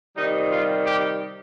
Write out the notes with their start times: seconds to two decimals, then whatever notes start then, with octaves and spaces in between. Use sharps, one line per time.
0.15 C3 D#3 G3 D#4
0.50 F4
0.86 G4